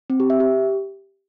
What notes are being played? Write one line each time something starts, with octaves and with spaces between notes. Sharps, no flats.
C4
G4
E5
G4